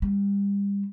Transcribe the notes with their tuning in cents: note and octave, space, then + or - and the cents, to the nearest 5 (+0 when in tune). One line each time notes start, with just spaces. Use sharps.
G3 +35